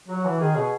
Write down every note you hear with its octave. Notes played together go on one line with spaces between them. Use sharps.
F#3 F#4
E3
D#3 G#4
B2